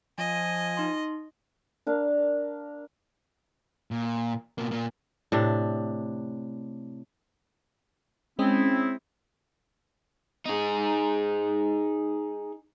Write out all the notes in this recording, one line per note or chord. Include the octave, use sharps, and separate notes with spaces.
F3 D#5 G#5
D#4 C6
D4 A#4 F5
A#2
B2 A#3
A#2 A#3
A2 C3 D4
G#3 C4 C#4 E4 D#6
D#4 G#4